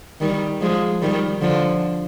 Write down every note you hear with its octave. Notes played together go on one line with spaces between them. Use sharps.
D#3 G3
F3 G#3
D#3 G3
D3 F3